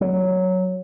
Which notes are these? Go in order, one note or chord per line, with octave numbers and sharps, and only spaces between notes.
F#3